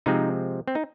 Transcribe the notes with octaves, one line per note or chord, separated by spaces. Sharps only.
C3 F3 G#3 C4 D#4
C4
D#4